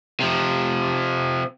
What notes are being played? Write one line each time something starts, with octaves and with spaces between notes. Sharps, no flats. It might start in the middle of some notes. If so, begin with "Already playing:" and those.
C3 F3